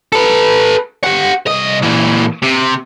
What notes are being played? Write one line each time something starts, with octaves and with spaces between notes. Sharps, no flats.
A4 B4
G4 F#5
C2 D#5
A#2 E3
C3